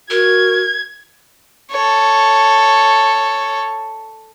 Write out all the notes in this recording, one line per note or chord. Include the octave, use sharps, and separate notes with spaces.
F#4 A#4 G#6
A4 C#5